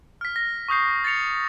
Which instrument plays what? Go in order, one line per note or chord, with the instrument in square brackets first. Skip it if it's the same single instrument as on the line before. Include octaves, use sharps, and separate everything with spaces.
[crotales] F6 B6
A#6
C#6 D#6 G6 C7
A6 C7 C#7 F7